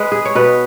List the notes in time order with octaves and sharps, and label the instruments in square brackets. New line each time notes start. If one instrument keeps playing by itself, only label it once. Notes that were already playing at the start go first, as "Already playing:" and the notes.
Already playing: [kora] G#3 B4
G#4
C#5
B2 B4